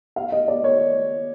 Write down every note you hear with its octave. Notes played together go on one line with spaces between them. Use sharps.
F5
D#5
D5
C#5